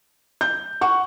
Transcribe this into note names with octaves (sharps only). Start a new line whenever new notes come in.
G6
F#5 C#6